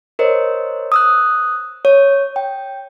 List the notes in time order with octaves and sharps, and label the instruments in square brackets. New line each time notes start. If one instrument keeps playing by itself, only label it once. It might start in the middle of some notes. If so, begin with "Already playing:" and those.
[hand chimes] A#4 C5 C#5 D#5
D#6 E6 F#6
C#5
G5